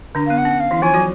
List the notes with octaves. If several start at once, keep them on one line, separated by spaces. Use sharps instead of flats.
D3 D4
B3 F5
F#5
C#4
F5
E3 E4
F3 F4 G#5
F#3 F#4